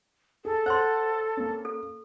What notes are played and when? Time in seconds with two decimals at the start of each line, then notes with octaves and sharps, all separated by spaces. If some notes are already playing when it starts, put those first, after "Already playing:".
0.45 G#4 A4
0.66 C5 C#5 F#5 C6
1.37 A#3 C#4
1.65 A4